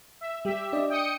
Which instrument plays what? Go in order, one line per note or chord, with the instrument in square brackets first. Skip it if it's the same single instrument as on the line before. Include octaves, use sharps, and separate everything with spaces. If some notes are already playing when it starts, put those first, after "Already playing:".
[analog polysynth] E5
[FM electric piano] G3 [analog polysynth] G4 E5
[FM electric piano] D4 D5 D#5
[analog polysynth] G5 D#6 C#7